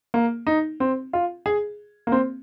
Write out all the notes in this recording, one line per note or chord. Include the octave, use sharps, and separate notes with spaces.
A#3
D#4
C4
F4
G#4
A#3
C4